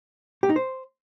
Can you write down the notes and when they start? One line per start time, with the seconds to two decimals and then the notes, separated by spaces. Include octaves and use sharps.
0.43 G4
0.49 D#4
0.56 C5